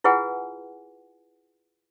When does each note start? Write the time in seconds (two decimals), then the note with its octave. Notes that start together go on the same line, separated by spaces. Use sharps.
0.04 E4 F4 G#4 B4 F#5 G#5